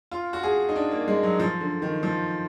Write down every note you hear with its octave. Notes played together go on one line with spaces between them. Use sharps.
F4
F#4
G#4
D#4
D4
A#3
G#3
F#3
F3
D3
D#3
F3